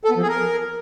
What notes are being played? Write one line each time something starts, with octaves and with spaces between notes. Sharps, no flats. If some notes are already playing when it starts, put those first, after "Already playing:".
A4
B3
F3
G#4
A#4